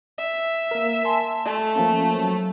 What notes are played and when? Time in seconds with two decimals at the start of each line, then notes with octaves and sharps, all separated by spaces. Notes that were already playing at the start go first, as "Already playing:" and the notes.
0.18 E5
0.71 A#3 A#4
1.05 G#5 A5 C6
1.45 A3
1.75 F3 A#3 C#4
2.15 F#3